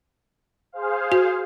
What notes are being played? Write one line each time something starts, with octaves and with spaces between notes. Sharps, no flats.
G#4 C5 F5
F#4